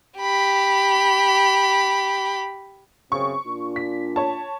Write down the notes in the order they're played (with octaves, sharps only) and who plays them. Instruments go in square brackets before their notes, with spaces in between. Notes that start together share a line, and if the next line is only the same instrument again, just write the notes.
[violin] G4 B5
[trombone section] F#2 C#3 C4 [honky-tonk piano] C#6
[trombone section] A#2 D4 F4
[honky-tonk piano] B6
C#5 A5